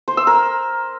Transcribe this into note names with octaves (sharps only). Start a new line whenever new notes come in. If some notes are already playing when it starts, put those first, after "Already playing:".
C5
E6
A#4